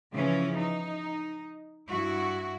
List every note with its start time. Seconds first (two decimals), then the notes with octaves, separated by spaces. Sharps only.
0.14 C#3 E3 F3 C#4
0.58 D#4
1.90 G2 E4 F#4